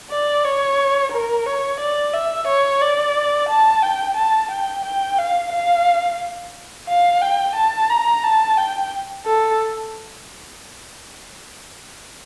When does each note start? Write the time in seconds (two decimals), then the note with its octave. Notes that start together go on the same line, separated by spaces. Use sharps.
0.11 D5
0.44 C#5
1.12 A#4
1.46 C#5
1.80 D5
2.14 E5
2.47 C#5
2.81 D5
3.49 A5
3.83 G5
4.17 A5
4.51 G5
4.85 G5
5.18 F5
5.52 F5
6.88 F5
7.22 G5
7.56 A5
7.90 A#5
8.24 A5
8.57 G5
9.25 A4